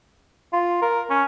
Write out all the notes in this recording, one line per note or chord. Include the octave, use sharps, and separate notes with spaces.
F4
A#4
C#4